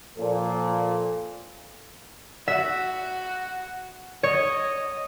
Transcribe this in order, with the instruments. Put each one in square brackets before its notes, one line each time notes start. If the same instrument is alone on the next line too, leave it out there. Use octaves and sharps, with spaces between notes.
[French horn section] A#2 F3 A4
[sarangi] F#4 [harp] E5
[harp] C#5 [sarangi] D#5